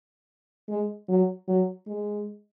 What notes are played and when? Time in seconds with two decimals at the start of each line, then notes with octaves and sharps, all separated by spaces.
0.69 G#3
1.09 F#3
1.48 F#3
1.87 G#3